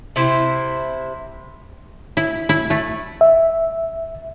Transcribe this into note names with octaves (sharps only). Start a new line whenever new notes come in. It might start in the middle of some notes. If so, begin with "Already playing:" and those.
C3 E4 C5
E4
E4
A3
E5